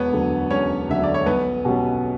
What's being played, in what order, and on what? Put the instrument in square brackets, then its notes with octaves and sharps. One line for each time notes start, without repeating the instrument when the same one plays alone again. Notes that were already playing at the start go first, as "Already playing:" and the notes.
Already playing: [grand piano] E1 [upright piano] B3 B4 C#5
[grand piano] D2 D3 F#3
[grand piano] E1 [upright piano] C#4 C#5
[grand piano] D2 D3 F#3 [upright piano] E5
[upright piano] D5
C#5
[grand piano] B1 [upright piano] B3 B4
[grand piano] B2 F#3 C#4 G4